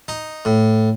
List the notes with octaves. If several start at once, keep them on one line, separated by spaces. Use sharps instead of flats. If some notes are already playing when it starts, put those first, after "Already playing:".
D#4
A2